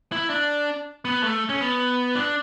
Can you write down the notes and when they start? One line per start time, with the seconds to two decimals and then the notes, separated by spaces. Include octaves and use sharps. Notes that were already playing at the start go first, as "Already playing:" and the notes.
0.12 E4
0.30 D4
1.05 B3
1.23 A3
1.49 C#4
1.61 B3
2.15 D4